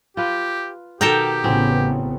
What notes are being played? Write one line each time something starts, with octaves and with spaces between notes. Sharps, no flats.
F4 G4 B4
B2 D#3 D#4 G4 A4 A#4 G5
A1 C#3 E3 B3 C4 F#4